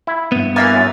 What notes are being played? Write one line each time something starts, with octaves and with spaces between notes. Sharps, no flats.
E4
G2 B3
E3 A#3 A#4 E5 G#5 A6
F#2